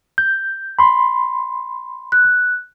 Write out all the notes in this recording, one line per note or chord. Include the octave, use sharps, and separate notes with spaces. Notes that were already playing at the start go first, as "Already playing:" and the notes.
G6
B5 C6
F#6